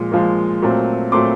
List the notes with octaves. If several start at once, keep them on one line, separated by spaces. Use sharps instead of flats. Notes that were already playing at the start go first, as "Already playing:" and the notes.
Already playing: A#2 F3 G#3
A#2 F3 G#3
A#2 F#3 A3 C4
A#2 F#3 A3 C4 C6 D6